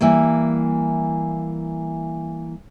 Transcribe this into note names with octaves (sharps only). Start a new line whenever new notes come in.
E3 G3 A#3